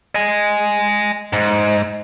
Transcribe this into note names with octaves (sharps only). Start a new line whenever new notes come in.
D#5 G#5
G#2